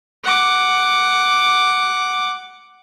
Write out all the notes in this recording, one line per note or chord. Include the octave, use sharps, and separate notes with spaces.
F#5 D6